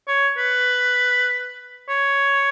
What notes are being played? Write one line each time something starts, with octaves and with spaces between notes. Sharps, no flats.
C#5
B4
C#5